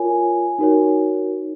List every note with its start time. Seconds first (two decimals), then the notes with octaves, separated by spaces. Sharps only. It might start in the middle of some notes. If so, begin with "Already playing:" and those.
Already playing: F4 A#4 C#5 G#5
0.59 D#4 F#4 A#4 C#5